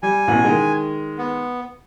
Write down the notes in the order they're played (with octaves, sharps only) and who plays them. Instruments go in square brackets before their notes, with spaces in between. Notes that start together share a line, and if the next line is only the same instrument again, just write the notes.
[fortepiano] G3 [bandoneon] G#5
[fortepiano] A1 B2 F#5
D#3 G#3
[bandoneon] B3